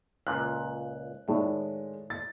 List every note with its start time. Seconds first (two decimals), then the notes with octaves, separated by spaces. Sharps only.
0.27 C#2 A#2 F#6
1.28 A2 D#3 G#3 D5
2.10 A6